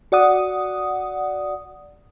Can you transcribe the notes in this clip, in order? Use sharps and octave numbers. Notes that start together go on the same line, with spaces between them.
F#4 D5 F#5 D#6